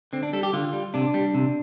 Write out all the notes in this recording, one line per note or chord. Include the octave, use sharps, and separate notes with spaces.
D3 C4
D4
G3 A4
G4
D3 F4
G3
C3 D4
G3
C3